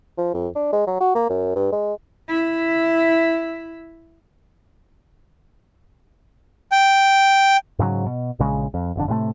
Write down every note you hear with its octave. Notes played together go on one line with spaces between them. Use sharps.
F3
F2
D4
G#3
F#3
F#4
A#3
F#2
G2
G#3
E4 E5
G5
G#2 C#3 E3 F#3
B2
A#1 C#3 G#3
F2
G1 F2 D3
A2 C3 G3 A3